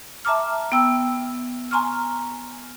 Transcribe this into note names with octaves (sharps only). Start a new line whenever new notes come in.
E5 A5 A#5 D6 F6
B3 G5 E6
G#5 A#5 C6 C#6 F6